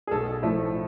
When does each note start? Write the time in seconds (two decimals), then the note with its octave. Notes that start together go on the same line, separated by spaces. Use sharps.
0.07 G#4
0.11 B1 A4
0.42 A2 F3 A3